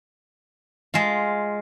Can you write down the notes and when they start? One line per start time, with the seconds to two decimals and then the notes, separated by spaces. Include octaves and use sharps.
0.94 G#3 F4